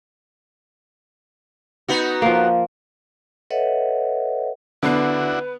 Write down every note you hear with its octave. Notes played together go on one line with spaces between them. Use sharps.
B3 D#4 F#4
F3 A#3
A4 B4 C#5 D#5 E5 F#5
D3 B3 D4 E4 F#4 B4 B5 C7